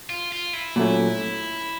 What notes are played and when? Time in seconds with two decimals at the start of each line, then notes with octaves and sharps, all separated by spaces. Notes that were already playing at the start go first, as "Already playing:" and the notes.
0.09 F4
0.32 F4
0.53 E4
0.76 A#2 F#3 A3 C#4